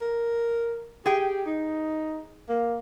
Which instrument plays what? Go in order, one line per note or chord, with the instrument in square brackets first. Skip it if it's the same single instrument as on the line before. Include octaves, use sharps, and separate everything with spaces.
[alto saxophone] A#4
[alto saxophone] G4 [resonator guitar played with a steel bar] G#4 G5
[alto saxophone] D#4
A#3